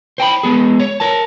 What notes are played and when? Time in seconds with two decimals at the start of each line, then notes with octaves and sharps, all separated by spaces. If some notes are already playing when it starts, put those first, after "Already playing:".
0.18 C5 G5 G#5 B5
0.43 G#3 B3 G#4
0.80 C#5
1.00 A#4 A5